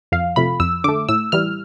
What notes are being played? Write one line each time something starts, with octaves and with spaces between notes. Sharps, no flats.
F2 F5
C3 F3 A3 B5
F2 E6
D3 A3 D6
A2 E6
E3 G3 F6